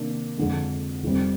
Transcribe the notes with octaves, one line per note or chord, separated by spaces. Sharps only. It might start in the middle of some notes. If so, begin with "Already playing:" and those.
Already playing: C3 D#3 A#3 D4
F2 D3 G#3
F1 F2 C3 G3 C4